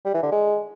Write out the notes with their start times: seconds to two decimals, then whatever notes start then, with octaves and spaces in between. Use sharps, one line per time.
0.05 G3
0.14 E3
0.23 D3
0.32 G#3